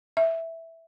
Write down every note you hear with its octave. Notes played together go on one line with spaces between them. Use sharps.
E5